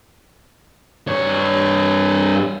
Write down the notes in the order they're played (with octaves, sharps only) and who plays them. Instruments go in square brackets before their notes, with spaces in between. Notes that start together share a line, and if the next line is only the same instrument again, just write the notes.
[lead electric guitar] G2 C#5